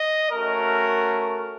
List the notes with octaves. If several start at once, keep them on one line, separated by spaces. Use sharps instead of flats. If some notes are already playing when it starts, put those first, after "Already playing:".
Already playing: D#5
A3 C#4 F#4 A#4